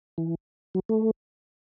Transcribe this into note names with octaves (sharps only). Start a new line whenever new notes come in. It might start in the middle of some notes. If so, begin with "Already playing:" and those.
E3
F#3
A3